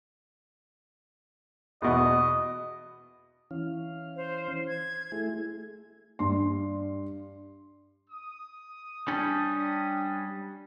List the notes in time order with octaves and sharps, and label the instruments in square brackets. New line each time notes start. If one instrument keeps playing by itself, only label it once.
[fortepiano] E2 B2 [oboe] D#5
[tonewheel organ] E3 C#4 F5
[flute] C5
G#6
[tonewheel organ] A3 E4 G#4
[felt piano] G2 C6
[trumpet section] D#6
[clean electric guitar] G3 C#4 [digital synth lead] D4